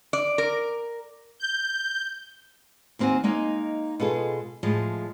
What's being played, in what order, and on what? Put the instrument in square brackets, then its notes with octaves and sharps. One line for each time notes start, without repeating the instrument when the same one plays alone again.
[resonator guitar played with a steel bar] D5
A#4
[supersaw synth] G6
[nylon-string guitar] D#2 A#3 C4 F#4 G#5
G#3 A#3 D#4
B2 G#3 F4 G#4 A4
A2 F3 G#3